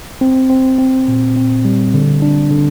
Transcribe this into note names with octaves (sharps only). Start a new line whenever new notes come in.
C4
C4
C4
A#2
C4
G3
D3
D4
D3